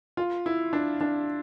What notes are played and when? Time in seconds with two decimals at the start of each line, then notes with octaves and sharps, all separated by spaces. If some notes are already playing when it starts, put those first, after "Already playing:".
0.17 F4
0.46 E4
0.73 D4
1.01 D4